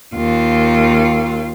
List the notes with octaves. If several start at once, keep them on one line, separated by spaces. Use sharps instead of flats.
D#2 F4